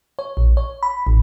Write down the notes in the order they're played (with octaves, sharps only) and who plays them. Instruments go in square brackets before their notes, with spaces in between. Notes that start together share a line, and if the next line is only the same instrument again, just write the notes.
[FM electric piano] C#5
A#1
C#5
B5
A1